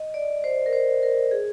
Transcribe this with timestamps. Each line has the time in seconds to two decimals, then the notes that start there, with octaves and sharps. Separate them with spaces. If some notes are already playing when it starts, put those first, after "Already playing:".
Already playing: D#5
0.14 D5
0.44 C5
0.66 A#4
0.73 C5
1.03 A#4
1.31 G#4